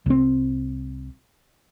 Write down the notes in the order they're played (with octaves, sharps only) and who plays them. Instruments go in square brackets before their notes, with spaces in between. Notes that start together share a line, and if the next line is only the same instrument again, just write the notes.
[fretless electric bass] C2 C4